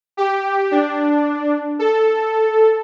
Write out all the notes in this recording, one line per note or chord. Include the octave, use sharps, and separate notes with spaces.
G4
D4
A4